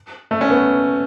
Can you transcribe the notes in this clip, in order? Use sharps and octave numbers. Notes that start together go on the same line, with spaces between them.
A3
C#4
B3